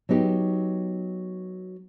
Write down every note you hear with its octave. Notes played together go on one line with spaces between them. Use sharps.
F#3 B3 D#4 G4